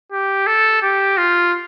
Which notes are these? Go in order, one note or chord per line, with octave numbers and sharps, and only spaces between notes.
G4
A4
G4
F4